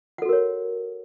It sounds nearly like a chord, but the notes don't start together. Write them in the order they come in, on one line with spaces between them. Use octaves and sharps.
F#5 A4 F#4 A#4 C#5